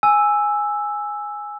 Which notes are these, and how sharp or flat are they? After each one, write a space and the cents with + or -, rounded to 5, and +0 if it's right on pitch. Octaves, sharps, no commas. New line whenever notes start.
G#5 +0 E6 +0